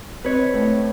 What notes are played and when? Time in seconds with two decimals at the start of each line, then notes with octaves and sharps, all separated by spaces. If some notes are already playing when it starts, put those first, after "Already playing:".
0.24 C4 B4 C#5
0.54 A2